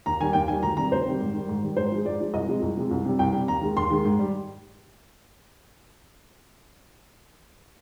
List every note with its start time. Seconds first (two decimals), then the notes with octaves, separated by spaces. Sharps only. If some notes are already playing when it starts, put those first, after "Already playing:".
0.06 D#2 A#5
0.20 D#3 G3 G#5
0.33 D#2 G5
0.48 D#3 G3 G#5
0.63 D2 A#5
0.77 C3 D#3 G3 A#5
0.91 D2 C5
1.06 C3 D#3 G3
1.21 G#2
1.34 D#3 G3
1.49 G#2
1.63 D#3 G3
1.77 G#2 C5
1.92 F3 G#3
2.05 G#2 D5
2.20 F3 G#3
2.33 C2 D#5
2.48 C3 F3 G#3
2.62 C2
2.77 C3 F3 G#3
2.91 C2
3.05 C3 G3
3.19 C2 G5
3.33 C3 G3
3.48 D#2 A#5
3.61 D#3 G#3
3.76 D#2 C6
3.91 D#3 G#3
4.05 G#2
4.19 G3